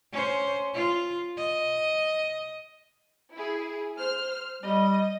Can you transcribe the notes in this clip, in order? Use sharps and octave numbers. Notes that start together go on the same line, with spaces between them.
C#4 C5
F4
D#5
E4 G#4
C5 F6
G3 D#5